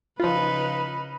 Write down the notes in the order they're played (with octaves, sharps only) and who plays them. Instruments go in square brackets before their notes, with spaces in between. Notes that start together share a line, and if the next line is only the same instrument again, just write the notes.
[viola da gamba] C#3 D#4 [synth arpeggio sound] F3 F4 [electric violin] B4